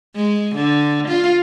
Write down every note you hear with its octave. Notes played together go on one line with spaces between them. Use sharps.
G#3
D3
F4